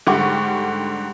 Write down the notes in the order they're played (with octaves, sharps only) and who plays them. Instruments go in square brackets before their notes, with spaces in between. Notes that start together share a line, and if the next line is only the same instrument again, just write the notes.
[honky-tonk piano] G#2 D3 G3 F#5 C#6 D6